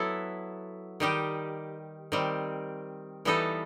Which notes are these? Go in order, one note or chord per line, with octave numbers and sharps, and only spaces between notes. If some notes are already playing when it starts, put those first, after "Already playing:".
Already playing: F#3 B3 E4 A4
D#3 G3 D#4 G4
D#3 G3 C4
E3 G3 B3 D#4 A4